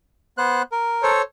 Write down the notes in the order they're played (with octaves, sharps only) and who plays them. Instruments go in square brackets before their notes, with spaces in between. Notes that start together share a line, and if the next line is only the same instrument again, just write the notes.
[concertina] B3 C5 F#6
A#4
[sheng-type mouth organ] A4 C5 C#5